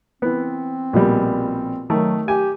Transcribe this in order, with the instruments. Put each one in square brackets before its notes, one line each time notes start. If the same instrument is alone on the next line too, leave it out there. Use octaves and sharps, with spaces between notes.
[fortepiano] E3 B3 [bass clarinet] C4
[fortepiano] A#1 B2 G3
[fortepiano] D#3 A3 [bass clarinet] F#3
[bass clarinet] G4 [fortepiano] G#5